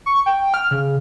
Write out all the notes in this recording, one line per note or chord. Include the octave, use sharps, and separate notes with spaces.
C#6
G5
F6
C#3